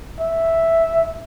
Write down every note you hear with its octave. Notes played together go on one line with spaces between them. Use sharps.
E5